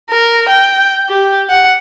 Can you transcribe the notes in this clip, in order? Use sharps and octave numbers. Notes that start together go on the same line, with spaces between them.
A#4
G5
G4
F#5